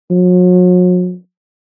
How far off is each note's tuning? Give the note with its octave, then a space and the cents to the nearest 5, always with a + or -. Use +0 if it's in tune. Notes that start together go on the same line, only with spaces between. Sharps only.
F#3 -40